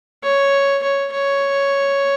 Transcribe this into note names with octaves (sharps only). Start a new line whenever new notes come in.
C#5
C#5
C#5